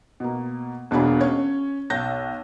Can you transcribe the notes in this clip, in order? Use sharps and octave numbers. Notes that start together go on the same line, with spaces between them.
B2 A#3
E1 B2 A#3 D4 G#4 B5
C#4 C#5
B1 G6 A#6